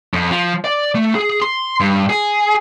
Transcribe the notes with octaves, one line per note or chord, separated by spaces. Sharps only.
F2
F3
D5
A3
G#4
C6
G2
G#4